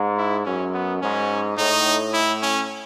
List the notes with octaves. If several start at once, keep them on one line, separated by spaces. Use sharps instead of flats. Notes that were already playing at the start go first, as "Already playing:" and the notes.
Already playing: G#2
E4
F#2 C#4
B3
G#2 C#4
A2 D#4
E4
C#4